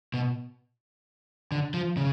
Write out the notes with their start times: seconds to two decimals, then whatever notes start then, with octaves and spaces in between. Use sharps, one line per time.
0.14 B2
1.52 D3
1.74 F3
1.97 C#3